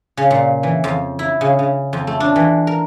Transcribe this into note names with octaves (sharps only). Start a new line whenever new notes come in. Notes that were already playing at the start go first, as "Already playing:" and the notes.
C#3
A#2
E3
F2
E4
C#3
C#3
F2
A3
D4
E3
A#4